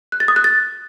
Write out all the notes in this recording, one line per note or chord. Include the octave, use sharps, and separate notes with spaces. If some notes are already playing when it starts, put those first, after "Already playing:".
F#6
A6
D#6
F#6
A6